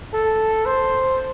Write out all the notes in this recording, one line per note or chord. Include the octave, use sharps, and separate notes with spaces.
A4
C5